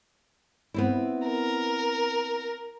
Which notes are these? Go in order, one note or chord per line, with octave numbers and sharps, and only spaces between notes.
B3 C4 E4
A#4